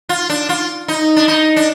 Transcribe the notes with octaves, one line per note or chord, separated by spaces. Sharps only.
F4
D4
F4
D#4
D4
D#4
D4